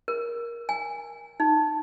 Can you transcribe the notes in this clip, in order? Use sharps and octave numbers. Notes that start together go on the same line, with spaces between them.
A#4
G#5
D#4